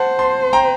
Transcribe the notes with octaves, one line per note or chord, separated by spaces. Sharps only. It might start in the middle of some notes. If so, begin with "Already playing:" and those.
Already playing: C5 F#5 A5
A5 C6
G5 A#5